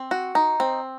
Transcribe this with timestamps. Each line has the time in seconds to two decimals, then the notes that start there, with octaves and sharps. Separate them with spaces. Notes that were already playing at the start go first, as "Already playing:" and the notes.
Already playing: C4
0.11 F#4
0.35 D#4
0.60 C4